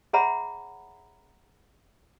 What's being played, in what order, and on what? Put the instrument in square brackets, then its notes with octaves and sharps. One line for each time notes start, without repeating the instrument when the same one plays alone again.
[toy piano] G#4 C#5 E5 F#5 A#5 B5